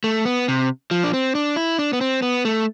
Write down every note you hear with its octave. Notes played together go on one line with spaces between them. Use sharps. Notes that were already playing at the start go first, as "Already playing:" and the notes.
A3
B3
C3
F3
D4
C4
D4
E4
D4
B3
C4
B3
A3